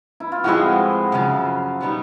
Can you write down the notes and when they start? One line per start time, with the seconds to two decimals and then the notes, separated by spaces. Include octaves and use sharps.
0.20 E4
0.32 F4
0.44 A2 F3 G#3 C4 E4 F#4
1.12 F#2 C#3 F3
1.81 B2 G3 B3 D#4